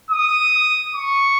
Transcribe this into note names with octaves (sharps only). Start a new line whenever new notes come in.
D#6
C#6